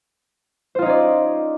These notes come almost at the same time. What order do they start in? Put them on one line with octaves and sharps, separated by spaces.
C5 F4 D#4 C#4 D5